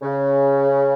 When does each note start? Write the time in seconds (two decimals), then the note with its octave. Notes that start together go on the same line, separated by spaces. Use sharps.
0.02 C#3